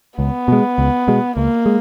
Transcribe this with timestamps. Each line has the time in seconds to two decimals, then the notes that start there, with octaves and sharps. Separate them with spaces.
0.19 C#2 B3
0.48 B2 G#3
0.78 C#2
1.08 B2 G#3
1.37 C#2 A#3
1.66 G#3